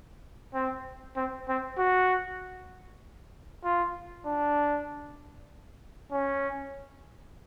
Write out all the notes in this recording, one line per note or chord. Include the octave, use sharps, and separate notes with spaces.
C4
C4
C4
F#4
F4
D4
C#4